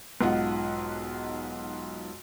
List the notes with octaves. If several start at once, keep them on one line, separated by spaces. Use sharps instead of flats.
B1 G#2 F4 D#5 F#5